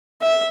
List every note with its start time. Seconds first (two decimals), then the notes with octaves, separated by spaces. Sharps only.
0.22 E5